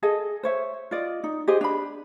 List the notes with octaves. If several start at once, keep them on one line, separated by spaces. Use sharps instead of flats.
G#4 A4 D#5
C5 C#5 E5
F4 D5 D#5
D#4
G4 G#4 C5 D#5
D4 B5